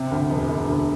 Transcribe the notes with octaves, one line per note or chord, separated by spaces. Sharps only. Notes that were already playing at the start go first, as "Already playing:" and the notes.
Already playing: C3
D2
E1
E1
D2